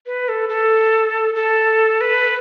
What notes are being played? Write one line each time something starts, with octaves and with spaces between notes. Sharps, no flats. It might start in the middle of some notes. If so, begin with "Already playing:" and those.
B4
A4
A4
A4
B4